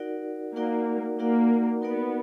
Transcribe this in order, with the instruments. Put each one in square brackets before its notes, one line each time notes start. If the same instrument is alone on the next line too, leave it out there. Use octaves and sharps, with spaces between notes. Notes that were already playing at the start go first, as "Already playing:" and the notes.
Already playing: [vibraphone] D#4 F#4 A#4 D5 F#5
[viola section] A#3 [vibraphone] D#4 F#4 A#4 D5 F#5
[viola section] A#3 [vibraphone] D#4 F#4 A#4 D5 F#5
[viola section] B3 [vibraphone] D#4 F#4 A#4 D5 F#5